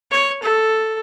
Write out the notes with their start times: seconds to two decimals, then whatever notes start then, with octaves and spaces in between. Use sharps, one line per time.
0.11 C#5
0.43 A4